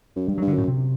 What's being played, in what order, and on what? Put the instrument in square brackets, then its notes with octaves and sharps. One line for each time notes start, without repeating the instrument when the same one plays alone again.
[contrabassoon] F#2
[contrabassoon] G2 [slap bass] G3
[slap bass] F#3
[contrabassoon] G2
[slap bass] D3
[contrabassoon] F#2 [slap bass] A2
[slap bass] C3